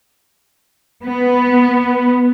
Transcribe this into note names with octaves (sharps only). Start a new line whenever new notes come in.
B3